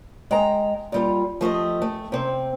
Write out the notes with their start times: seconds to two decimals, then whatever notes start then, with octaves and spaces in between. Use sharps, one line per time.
0.31 G#3 G5 A#5
0.92 A#2 G3 F4
1.41 F3 A3 G4 D#5
1.82 A3
2.12 C3 C4